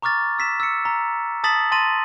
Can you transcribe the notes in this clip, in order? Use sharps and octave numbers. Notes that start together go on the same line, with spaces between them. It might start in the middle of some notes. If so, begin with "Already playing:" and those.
A#5 C#6 D6 F6 A6
E6 B6 E7
E6 C#7
A#5
A5 D#6 A6 B6 F#7
A5 C6 A6 A#6 D#7 F#7